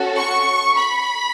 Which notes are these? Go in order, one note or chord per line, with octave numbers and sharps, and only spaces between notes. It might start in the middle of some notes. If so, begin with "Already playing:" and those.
Already playing: C#4 F#4 A4
C#6
B5